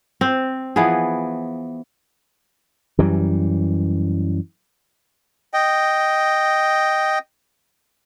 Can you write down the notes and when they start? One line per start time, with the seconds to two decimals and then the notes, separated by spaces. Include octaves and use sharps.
0.21 C4
0.76 E3 F3 B3 G#4
2.98 F#2 E3 G3
5.54 D#5 G5